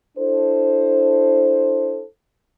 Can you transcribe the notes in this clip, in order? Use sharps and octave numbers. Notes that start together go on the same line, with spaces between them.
D4 E4 A4 C5